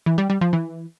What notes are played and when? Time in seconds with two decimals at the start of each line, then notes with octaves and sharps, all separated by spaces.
0.06 E3
0.18 G3
0.30 G3
0.41 F3
0.53 E3